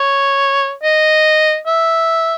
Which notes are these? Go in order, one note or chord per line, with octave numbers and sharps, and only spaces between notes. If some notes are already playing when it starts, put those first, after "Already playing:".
Already playing: C#5
D#5
E5